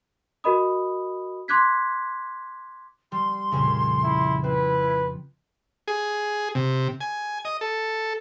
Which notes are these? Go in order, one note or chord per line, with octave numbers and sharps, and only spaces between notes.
F#4 A#4 D#5 B5 D#6
C6 D6 F#6 G#6 B6
G3 C6
F2 A#2 C#3
E4
C4 E4 B4
G#4
C3
G#5
D#5
A4